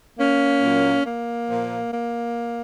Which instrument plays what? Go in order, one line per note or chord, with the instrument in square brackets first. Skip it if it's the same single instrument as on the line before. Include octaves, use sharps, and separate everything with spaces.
[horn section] A#3 C#4
A#2 F#3
A#3
A#2 F3
A#3